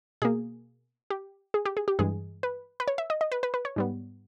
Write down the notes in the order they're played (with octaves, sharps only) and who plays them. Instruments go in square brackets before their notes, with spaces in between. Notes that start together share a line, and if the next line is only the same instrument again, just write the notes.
[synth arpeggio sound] B2 A#3 G#4
G4
G#4
G4
G#4
G4
G2 E3 G#3 G#4
B4
B4
C#5
E5
D#5
D#5
B4
B4
B4
C#5
G#2 G3 B3